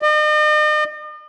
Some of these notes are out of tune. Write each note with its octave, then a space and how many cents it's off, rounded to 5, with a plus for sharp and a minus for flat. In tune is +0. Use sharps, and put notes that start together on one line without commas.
D#5 -45